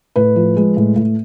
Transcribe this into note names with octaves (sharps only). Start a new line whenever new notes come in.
A2 B4
F3
G#3
A2
A2